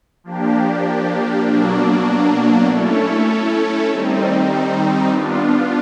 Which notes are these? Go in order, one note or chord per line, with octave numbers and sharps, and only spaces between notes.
F3 A#3 D4 G4
B2 F#3 A#3 D4
A3 C#4 E4 A4 C#5
D#3 G3 C4 D#4
B3 D4 F4